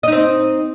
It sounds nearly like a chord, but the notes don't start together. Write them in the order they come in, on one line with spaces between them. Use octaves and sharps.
D#5 D#4 C4